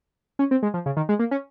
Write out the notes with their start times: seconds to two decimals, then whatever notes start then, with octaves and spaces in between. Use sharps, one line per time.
0.39 C#4
0.51 C4
0.63 G#3
0.74 F3
0.86 C#3
0.97 D#3
1.09 G#3
1.19 A#3
1.31 C#4